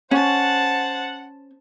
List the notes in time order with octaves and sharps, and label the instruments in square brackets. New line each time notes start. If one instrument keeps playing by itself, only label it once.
[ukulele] C#4 [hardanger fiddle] C5 A5 [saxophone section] F#5